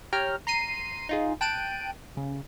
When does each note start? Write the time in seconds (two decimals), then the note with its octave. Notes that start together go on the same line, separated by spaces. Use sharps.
0.13 G4 C#5 G5 A#5 F6
0.47 A#5 C6 C7 D#7
1.09 D#4 F4 G#4
1.41 G5 A5 F#6 D7 D#7
2.17 C#3